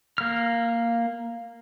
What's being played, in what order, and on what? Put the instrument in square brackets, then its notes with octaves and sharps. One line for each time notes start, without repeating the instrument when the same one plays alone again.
[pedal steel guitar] A#3 F6